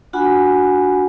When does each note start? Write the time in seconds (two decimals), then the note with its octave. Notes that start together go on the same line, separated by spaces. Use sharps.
0.13 D4 F4 F#4 F#5 G#5 B5